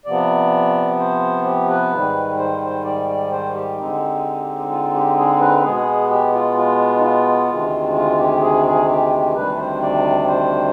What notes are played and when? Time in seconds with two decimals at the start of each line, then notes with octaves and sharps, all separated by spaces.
0.06 C3 F3 B3 D5
0.99 C5
1.45 G4
1.69 B4
1.91 G#2 D#3 G3
2.38 C5
2.62 C5
2.84 D5
3.08 D5
3.31 C5
3.54 G4
3.78 D3 G#3 C4 D#4
4.71 F4
4.94 G4
5.17 G#4
5.40 B4
5.64 B2 G#3 B3 G#4
6.10 G4
6.33 F4
6.57 F4
6.98 D#4
7.03 F4
7.49 D2 C3 D#3 G#3
7.95 F4
8.19 G4
8.42 G#4
8.66 G#4
8.89 G4
9.35 D2 C3 D#3 G3 D4 B4
9.58 C5
9.82 D5
10.28 C5